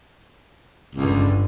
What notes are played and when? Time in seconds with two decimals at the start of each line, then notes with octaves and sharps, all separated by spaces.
0.95 G1 C#2 G2 D3